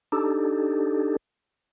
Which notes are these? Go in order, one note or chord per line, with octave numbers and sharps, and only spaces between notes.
D4 D#4 G4 A4